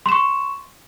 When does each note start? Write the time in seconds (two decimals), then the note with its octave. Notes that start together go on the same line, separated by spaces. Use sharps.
0.06 C6
0.09 E7
0.12 C#6